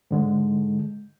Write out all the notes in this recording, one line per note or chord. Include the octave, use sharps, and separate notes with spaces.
G#2 D3 G#3